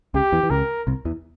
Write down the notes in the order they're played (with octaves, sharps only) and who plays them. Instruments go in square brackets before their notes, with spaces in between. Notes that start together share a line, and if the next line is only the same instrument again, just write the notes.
[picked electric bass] C#2 C#3 [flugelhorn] G4
[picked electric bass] E2 E3
E3
[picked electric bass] C#2 C#3 [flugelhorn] A#4
[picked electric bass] C2 C3
E2 E3